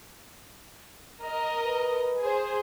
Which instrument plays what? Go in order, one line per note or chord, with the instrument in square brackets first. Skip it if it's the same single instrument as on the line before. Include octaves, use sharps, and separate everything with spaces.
[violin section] A#4 D#5
[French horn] B4
[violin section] G#4 C5